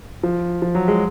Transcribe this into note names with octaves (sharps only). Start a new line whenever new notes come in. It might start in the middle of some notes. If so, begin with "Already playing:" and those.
F3
F3
F#3
G#3